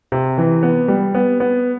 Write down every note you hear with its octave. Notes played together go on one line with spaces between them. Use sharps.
C3
E3
B3
G3
B3
B3